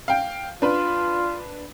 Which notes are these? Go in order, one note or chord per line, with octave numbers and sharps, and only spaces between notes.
F5 G5
D4 F4 B4